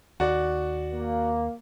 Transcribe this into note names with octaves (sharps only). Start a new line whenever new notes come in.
D#2 F#4 D5
A#3